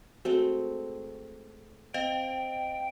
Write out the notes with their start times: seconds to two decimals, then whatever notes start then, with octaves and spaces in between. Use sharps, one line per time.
0.25 G#3 A3 C4 F#4
1.94 C4 D#5 F5 G5